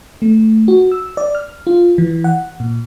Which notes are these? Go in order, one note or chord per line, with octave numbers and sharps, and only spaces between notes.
A3
F#4
E6
D5
F6
F4
E3
F#5
A#2